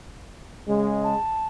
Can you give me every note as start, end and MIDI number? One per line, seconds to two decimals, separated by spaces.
0.67 1.16 49
0.67 1.16 56
1.04 1.47 81